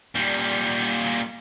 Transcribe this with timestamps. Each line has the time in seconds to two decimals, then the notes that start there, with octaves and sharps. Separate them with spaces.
0.15 A#2 G3